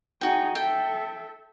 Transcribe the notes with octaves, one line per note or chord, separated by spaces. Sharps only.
D#4 F#4 G#4 G5
A4 E5 G5